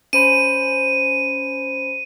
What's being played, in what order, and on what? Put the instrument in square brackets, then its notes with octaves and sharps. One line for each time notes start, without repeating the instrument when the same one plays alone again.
[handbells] C#4 C5 B5 [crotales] D#7